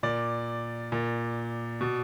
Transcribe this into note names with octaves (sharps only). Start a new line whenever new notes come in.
A#2 D5
A#2
B2